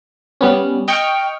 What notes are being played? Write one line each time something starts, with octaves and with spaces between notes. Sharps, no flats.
G3 B3 C#4
D#5 G5 C#6 F6